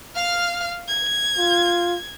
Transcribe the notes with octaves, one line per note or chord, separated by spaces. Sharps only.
F5 F6
G#6
F4